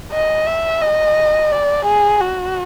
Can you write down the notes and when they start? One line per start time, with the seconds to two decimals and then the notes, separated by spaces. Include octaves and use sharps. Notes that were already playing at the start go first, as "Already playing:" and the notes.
0.12 D#5
0.47 E5
0.82 D#5
1.51 D5
1.85 G#4
2.21 F#4